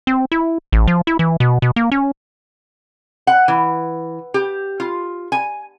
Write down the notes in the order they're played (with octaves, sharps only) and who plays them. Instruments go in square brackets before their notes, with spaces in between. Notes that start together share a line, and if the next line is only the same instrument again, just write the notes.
[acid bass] C4
E4
A1
F3
E4
E3
B2
B2
A#3
C#4
[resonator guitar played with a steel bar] F#5
E3
G4
F4
G#5